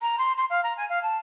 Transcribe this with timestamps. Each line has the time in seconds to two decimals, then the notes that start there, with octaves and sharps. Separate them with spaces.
0.02 A#5
0.18 C6
0.37 C6
0.50 F5
0.63 A#5
0.77 G#5
0.89 F5
1.02 A5